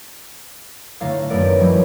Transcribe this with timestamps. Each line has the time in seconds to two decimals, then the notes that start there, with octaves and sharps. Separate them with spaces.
1.00 A2 D3 A3 F5 A#5 F6
1.30 F#2 D#3 A3 B3 A#4 D5
1.58 A2 D#3 F3 G3 G#3 E4